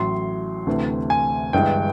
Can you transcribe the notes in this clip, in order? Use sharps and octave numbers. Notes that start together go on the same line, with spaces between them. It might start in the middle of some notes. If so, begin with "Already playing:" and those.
Already playing: A1 A2 F#3 C6
D2 C3 E3 A3
G#5
G1 G2 E3 G#3 G5